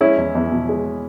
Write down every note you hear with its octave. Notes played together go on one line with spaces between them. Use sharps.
G#3 C#4 E4
E2
E2
B2
G#3